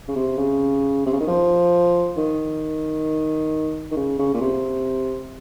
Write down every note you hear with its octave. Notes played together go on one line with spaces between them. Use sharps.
C#3
C3
C#3
C3
C#3
D#3
F3
D#3
D#3
C#3
C#3
A#2
C3